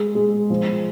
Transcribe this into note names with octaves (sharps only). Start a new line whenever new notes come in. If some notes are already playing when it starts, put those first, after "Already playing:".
Already playing: G#3
G#3
F3